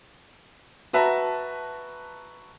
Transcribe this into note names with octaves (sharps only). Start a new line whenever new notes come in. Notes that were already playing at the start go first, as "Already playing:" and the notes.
F#4 B4 E5 A5 A#5